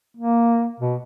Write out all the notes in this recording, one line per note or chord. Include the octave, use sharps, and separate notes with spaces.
A#3
B2